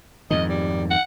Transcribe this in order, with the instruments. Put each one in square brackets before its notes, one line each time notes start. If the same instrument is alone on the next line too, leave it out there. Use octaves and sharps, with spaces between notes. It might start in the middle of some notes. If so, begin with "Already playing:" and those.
[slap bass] F2 G#2 D#3 [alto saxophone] D#5
[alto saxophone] G3
F#5